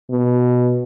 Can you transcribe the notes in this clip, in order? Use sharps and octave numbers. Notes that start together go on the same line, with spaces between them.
B2